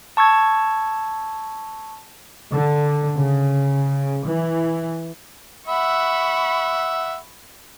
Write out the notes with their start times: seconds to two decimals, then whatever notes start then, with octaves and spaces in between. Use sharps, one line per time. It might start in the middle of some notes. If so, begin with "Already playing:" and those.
0.17 A5 C#6 E6 G#6
2.53 D3
3.18 C#3
4.26 E3
5.68 E5 F#5 B5 C#6